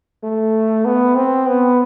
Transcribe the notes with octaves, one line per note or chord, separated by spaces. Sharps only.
A3
B3
C4
B3